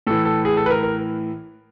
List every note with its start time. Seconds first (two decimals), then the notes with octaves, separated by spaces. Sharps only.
0.07 A2 E3 A4
0.25 A4
0.45 G#4
0.57 A4
0.66 B4
0.70 A#4
0.83 A#4